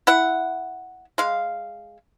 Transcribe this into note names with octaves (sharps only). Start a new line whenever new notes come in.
E4 F#5
G#3 F5